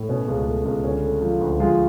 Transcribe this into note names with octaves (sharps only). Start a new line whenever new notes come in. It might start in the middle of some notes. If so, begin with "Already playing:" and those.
Already playing: A2
B2 C#4
C#2
A3
C#2
D3 C#4
A3
F3
D2
F3 G#3 F4